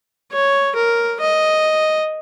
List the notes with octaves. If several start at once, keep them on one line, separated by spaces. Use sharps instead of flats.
C#5
A#4
D#5